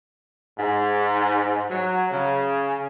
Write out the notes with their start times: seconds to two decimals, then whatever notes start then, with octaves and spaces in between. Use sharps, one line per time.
0.58 G#2
1.71 F#3
2.11 C#3